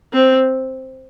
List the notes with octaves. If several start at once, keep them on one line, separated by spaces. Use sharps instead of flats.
C4